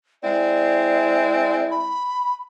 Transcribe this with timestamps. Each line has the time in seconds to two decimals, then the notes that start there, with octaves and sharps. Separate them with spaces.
0.23 G#3 C4 E4 D5
1.71 B5